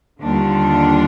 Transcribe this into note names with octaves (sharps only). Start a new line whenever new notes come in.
D#2 D3 G3 D4 F4